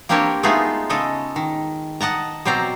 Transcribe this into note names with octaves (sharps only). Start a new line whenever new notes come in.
A#3 C4 D4 G4 A#4 C#5
G#3 A3 B3 D#4 F4 G#4
C#3 G#3 A4 D#5
D#3
D#5 F#5 A5 A#5
B2 F#3 C4 C5 D5 A#5